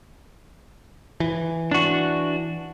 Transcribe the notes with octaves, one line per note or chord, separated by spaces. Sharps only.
E3
D4 F#4